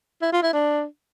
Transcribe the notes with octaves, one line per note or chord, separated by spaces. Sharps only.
E4
F4
E4
D4